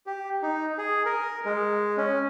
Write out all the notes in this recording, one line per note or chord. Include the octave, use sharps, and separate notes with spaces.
G4
D#4
G#4
A#4
G#3
C#4